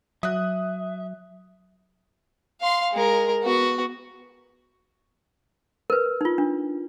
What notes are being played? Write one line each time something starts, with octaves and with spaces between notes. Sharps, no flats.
F#3 E5 D#6 F#6
F5 C6
G#3 A#4
B3 F#4
A#4 B4
D#4 F4
D4